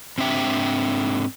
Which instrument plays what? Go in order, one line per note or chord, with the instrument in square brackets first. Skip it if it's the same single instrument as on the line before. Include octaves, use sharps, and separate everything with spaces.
[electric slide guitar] G#2 C4 D4 E5 G5